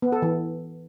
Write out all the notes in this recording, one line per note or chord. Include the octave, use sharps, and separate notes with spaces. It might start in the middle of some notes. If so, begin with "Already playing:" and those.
B3
A4
E3